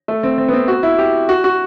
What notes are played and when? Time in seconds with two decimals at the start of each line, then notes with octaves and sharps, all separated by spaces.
0.08 A3
0.23 C4
0.38 C4
0.48 B3
0.53 C4
0.68 F#4
0.83 E4
0.98 G4
1.29 F#4
1.44 F#4